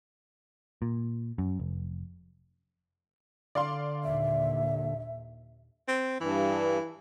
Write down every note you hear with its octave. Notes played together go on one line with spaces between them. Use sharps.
A#2
F#2
F1
D3 D5 F5 C6
D#2 A#2 E5
C4
G2 E3